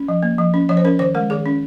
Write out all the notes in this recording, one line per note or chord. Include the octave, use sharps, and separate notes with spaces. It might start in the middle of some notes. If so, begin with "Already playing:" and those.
Already playing: C#4
F3
A#3
F3
C#4
F3 C#5
C5
C#4 A#4
D#3 C5
G#3 A#4
D#3 G#4
C#4